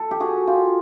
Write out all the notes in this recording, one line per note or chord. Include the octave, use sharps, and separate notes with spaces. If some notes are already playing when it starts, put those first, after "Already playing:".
Already playing: A4
G4
F#4 G#4
F4 G4